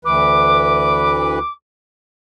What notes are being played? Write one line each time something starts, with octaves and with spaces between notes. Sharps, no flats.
D2 E3 B4 D6